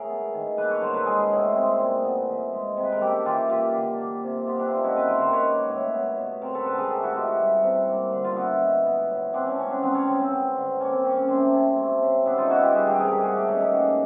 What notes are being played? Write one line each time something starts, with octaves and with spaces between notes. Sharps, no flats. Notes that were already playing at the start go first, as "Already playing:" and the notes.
Already playing: A2 G#4 A#4
B3
D#3
A#3 A4 B4
B4 C#5
B2 A#4 C5
A4 B4
G#3 G#4 A#4
A2
C4
A#2
B3
E3
G#3
C3
B4
A#4
A#3 G4 A4
E3 F4 G4
A#3 F4 G4
D3
A#3
C3
B3 F4 G4
D4 E4
A#2 D#4 F4
E4 F#4
C4 A4 B4
A#4 C5
D#3 A#4 C5
B4 C#5
A#3
A2
B3
B2
C4 A#4 C5
A4 B4
D3 A4 B4
G#4 A#4
A3 G4 A4
E4 F#4
B2 F4 G4
E4 F#4
G3
C3
A#3
D3
F4
B3 E4 F#4
B2
B3
A2
B3 C4 D4
C#4
C#3 C#4
C4 D4
B3 C4 D4
C#4
C#3 C4
C4
B3
D3
A#3 C#4
C4
C#3 C#4
C#4
A3 C4 D4
C3
A3
C#3
B3 D4 E4
D#4 F4
B2 E4 F#4
F4 G4
G3 F#4 G#4
G4 A4
C3 G#4 A#4
G4 A4
A3 F#4 G#4
G4 A4
B2 C#4 D#4
G4 A4
A#3 F#4 G#4